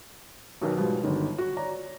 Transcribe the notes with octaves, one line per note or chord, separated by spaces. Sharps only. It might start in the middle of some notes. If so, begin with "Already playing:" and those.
B1 B2 D#3 A#4
G#2 B2 F3 G3
G1 D3 D#3
F#4
C#5 D5 A#5